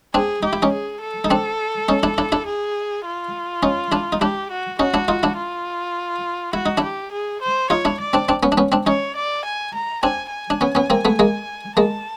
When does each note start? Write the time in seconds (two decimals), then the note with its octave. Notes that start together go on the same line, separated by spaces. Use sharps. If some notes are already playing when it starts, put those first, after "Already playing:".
0.14 C4 D4 G#4
0.43 D#4 G4
0.53 E4
0.62 C#4 D#4
0.72 G#4
1.02 A4
1.24 D#4
1.30 C4 D4
1.88 C#4 D#4
2.03 D4 E4
2.18 D4 E4
2.32 D4 E4
2.46 G#4
3.05 F4
3.63 C#4 D#4
3.92 D4 E4
4.12 D#4
4.21 D4 E4 G4
4.51 F#4
4.79 C#4 D#4 F#4
4.94 D4 E4
5.08 D#4 F4
5.23 D4 E4
5.37 F4
6.53 E4 F#4
6.66 D#4
6.77 D4 E4
6.84 G4
7.12 G#4
7.41 C5
7.70 D#4 F4 C#5
7.85 D4 E4
8.00 D5
8.13 C4 D4
8.29 C4 D4
8.43 B3 C#4
8.52 D4
8.57 B3 C#4
8.72 C4 D4
8.86 C#4 D#4 C#5
9.16 D5
9.45 G#5
9.74 A#5
10.03 C4 D4 G#5
10.32 G#5
10.50 D4
10.61 B3 C#4
10.75 B3 C#4
10.90 A#3 C4
11.05 A3 B3
11.19 G#3 A#3
11.77 G#3 A#3 A5